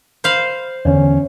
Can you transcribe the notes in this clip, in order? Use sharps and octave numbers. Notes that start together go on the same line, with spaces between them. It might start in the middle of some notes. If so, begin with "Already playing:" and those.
C5 F5 B5
E2 D3 C#4